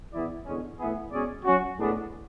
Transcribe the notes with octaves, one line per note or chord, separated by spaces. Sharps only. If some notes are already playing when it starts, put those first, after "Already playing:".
E3 B3 E4 G#4 D5
E2 D3 G#3 C#4
A2 E3 B3 E4 G#4
B2 G#3 C#4 G#4 D5
F#3 C#4 F#4
A2 G#3 B3 D4